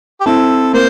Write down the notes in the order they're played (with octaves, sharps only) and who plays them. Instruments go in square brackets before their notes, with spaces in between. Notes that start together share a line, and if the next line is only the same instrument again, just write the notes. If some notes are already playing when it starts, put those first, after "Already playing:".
[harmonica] G4
[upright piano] C4 E4 [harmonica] A4
[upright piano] A#3 [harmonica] C5